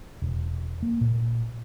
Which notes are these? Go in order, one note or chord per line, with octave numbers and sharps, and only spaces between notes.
E1
A#3
A#2